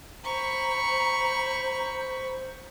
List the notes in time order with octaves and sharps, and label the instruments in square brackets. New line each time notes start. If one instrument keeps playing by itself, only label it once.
[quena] C5 [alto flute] A#5 [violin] B5 C#6